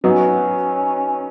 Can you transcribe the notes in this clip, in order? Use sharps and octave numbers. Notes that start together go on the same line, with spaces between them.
F#3 B3 C#4 D#4 F#4